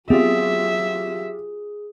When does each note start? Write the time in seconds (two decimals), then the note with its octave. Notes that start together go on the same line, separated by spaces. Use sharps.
0.10 F#3 B3 C4 F4 G4 G#4 E5